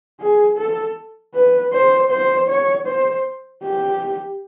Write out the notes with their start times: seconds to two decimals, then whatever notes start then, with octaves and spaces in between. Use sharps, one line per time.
0.21 G#4
0.58 A4
1.34 B4
1.73 C5
2.11 C5
2.49 C#5
2.87 C5
3.64 G4